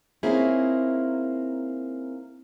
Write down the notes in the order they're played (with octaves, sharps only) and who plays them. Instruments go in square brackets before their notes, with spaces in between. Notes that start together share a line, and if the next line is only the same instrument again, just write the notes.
[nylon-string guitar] A#3 C4 C#4 D#4 E4 G#4